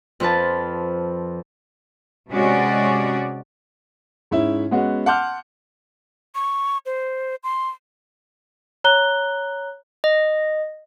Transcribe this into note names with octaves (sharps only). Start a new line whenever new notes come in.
F2 F3 B4 A5
C3 G#3 C#4 F#4 C#5 D5
G#2 C#4 E4 E5
G#3 B3 C#4 F#4
F#5 A5 C6 D6 F6 G6
C#6
C5
C6
C#5 A#5 F#6 G7
D#5